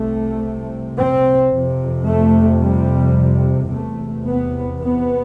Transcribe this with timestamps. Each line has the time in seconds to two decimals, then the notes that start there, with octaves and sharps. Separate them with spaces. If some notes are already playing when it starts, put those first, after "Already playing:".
Already playing: C2 C3 A3
0.98 C4
1.52 F2 C3
2.07 A3
2.62 G3
3.70 E2 C3 A3
4.25 B3
4.80 B3